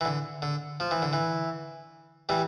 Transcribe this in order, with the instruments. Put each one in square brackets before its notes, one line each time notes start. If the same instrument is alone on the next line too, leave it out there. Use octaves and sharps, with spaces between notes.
[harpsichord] E3
D3
D3
F3
E3
D3
E3
E3 G3